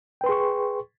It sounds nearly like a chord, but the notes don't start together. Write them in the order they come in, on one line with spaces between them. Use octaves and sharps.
G5 B4 C6 G#4 C#6